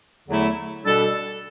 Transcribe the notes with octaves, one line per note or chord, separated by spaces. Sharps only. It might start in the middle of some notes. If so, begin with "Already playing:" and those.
E2 D3 F#3 A3 E4
B2 G3 D4 A4